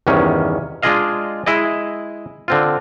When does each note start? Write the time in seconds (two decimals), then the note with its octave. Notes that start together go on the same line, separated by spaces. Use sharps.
0.07 E2 G2 C3 D#3 C#4
0.83 G#3 D4 F4 G#4 D#5 F5
1.46 G#3 E4 G#4 D#5
2.48 D3 C4 F4